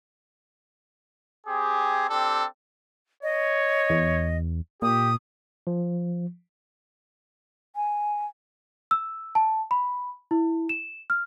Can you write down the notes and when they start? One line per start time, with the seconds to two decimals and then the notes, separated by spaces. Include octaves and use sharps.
1.47 C4 G4 G#4
2.08 C4 D4 G4 A4
3.23 C#5 D#5
3.90 E2
4.82 A#2 G4 D#6
5.67 F3
7.76 G#5
8.91 E6
9.35 A5
9.71 B5
10.31 E4
10.69 E7
11.10 F6